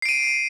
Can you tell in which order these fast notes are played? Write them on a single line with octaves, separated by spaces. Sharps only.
C7 D7 D#7